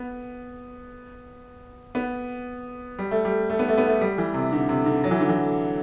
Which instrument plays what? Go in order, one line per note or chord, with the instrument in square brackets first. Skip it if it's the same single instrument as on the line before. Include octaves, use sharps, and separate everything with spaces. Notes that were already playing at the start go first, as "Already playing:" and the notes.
Already playing: [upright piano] B3
B3
G3
A3
G3
A3
B3
A3
B3
A3
G3
E3
C3
D3
C3
D3
F#3
E3
D3
E3